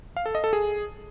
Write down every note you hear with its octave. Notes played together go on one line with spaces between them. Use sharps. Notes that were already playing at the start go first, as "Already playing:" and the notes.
F5
A4
D#5
A4
G#4